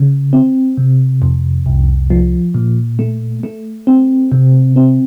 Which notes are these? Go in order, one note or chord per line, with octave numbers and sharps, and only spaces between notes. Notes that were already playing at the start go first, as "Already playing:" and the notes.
Already playing: C#3
C4
C3
F2
C2
F3
A#2
A3
A3
C4
C3
C4